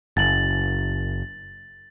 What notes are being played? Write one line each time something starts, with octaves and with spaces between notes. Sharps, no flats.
F#1 A6 F#7